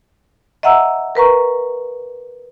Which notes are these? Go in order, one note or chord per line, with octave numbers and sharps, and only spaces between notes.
D#5 E5 F#5 A#5 E6
A#4 B4 A#5 C#6